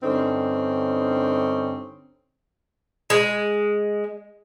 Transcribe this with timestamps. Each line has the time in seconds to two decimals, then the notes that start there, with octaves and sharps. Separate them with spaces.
0.02 G2 D3 C4 C#4 D#4
3.10 G#3